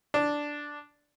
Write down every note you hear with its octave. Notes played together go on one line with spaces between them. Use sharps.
D4